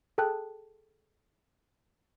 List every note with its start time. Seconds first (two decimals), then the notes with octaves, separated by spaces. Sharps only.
0.18 G#4 A4 G5 A5 F#6